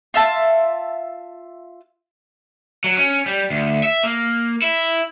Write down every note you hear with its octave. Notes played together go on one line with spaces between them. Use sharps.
F4 E5 A5
F#3
C#4
G3
D2
E5
A#3
E4